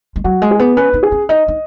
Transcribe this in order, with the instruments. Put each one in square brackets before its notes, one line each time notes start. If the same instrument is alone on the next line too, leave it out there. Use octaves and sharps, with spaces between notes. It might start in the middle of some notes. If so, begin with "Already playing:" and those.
[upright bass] G#3
[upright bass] F#3 [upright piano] F#4
[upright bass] G#3
[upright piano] G#4
[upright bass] B3
[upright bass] C#4 [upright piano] B4
[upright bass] D#4
[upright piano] G#4
[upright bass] C#4
[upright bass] D#4 [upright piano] D#5
[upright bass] D#4